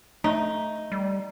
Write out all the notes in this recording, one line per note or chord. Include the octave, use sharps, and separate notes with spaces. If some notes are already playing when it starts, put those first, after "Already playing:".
A3 D#4
G3